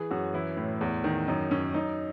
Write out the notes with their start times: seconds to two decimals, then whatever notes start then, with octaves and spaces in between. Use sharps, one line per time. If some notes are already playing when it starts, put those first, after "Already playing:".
Already playing: E3 G#4
0.11 F#2 F#4
0.34 E3 E4
0.57 A2
0.81 E2
1.04 D#3
1.28 F#2 D#4
1.51 F#2 C#4
1.74 F#2 D#4